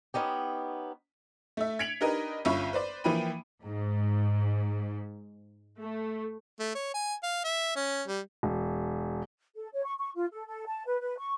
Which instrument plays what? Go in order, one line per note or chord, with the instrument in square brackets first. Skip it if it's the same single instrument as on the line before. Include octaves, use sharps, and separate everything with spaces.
[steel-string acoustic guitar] B3 C#4 D#4 G4
[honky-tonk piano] A3 E5
G#6 B6 C#7 D7 F7 F#7
D4 D#4 G4 A#4 B4 D#5
G1 C#4 F4 E5 B5 C#6
B4 C5 D5
E3 F3 A#3 G5 B5 D#7
[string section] G#2
A3
[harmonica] A3
C#5
G#5
F5
E5
C#4
G3
[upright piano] E1
[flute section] A4
C#5
C#6
C#6
F4
A4
A4
A5
B4
B4
C#6